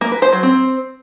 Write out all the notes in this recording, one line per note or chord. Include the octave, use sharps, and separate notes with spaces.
A#3
B4
C5
F#3
C4